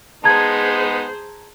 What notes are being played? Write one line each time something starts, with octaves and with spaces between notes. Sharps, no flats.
G#3 B3 D#4 G#4 C5 A5 A#5 G#6